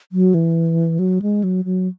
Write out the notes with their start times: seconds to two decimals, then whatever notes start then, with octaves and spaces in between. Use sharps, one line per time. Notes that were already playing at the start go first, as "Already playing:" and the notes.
0.12 F#3
0.34 E3
0.99 F#3
1.22 G#3
1.44 F#3
1.65 F#3